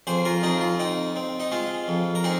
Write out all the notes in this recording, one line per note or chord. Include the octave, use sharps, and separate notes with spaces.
F2 G#4 C5
F4 A#4
F2 D#4 G#4
F4
C4 D#4
C4
D#4
G#3 F4
F2
A#4
C4 D#4 G#4